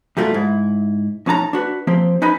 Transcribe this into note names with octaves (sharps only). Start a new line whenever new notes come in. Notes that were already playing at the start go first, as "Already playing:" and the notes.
F#2 G3 A3 A#3 F4
G#2 E4
F2 C#4 D#4 A5 A#5
D4 F#4 B4
F3 A#3 C4 G4
C#4 D#4 B4 D#5 G#5 B5